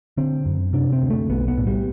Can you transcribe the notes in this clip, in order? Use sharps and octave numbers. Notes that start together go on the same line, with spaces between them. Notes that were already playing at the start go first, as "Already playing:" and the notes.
D3 C4
F#2
C3 D4
C4
D2
A3
B1 B3
B3
A2
G3